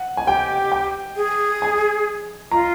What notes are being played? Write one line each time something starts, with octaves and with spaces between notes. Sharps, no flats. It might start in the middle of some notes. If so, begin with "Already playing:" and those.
Already playing: F#5
G#5
G4 G5
G5
G#4
G#5
F4 A#5